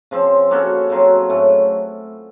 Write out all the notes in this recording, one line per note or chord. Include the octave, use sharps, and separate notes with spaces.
C#3 F3 C4
A#3 C#4 F#4 A4
C#3 F#3 C4
A2 A3 C#4